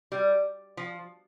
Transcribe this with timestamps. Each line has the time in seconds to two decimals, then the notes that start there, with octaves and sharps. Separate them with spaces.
0.12 G3
0.77 F3